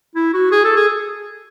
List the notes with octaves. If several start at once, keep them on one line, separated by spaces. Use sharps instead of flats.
E4
F#4
G#4
A4
G#4